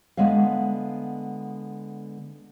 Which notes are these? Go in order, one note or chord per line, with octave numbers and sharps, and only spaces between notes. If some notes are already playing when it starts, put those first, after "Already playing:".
D3 G#3 B3 E5 F5